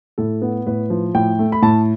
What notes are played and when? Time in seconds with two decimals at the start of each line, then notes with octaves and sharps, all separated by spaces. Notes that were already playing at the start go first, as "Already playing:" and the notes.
0.18 A2 A4
0.42 B3
0.67 A2 B4
0.90 F3
1.15 A2 G5
1.39 A3
1.52 B5
1.62 A2 A5